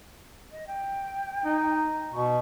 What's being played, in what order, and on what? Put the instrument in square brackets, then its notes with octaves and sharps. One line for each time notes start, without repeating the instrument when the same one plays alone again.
[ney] D#5
G5
[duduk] D#4
[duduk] B2 [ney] C#6